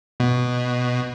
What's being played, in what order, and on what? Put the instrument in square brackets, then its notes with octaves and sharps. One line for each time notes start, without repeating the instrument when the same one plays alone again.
[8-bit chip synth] B2